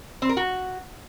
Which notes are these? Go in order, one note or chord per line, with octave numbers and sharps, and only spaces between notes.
C4
A#4
F#4